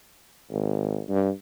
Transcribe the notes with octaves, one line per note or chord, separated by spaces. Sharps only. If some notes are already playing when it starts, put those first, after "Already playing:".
G#1
G2